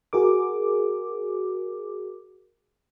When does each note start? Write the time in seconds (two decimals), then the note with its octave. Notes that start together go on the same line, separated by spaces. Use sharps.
0.13 F#4 G#4 A#4 D6